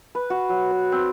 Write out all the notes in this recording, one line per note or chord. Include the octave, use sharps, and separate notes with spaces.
B4
F#4
F#3
B4
C4